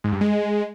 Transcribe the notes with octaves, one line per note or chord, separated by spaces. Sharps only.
G#2
G2
G#3